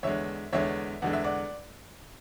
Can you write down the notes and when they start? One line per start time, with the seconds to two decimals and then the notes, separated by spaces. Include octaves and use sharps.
0.03 E2 D3 G#3 C#5 E5
0.53 E2 D3 G#3 C#5 E5
1.02 E2 D3 G#3 F#5
1.13 E5
1.24 D5 F#5